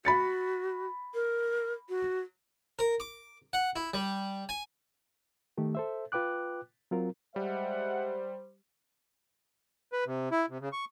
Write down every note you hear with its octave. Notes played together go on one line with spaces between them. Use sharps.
F#4 B5 A6 C#7
A#4
F#4
A#4
D6
F#5
E4
G3
G#5
D#3 A3 G4
A4 C5 E5
F4 B4 G5 D6 F#6
F#3 C4 F4 A#4
G3 G#3 C5 E5 F#5
B4
C3
E4
C3
C#3
C#6